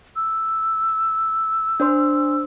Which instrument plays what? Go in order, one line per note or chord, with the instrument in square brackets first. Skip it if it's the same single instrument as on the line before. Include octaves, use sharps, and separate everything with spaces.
[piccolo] E6
[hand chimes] D4 C5 C6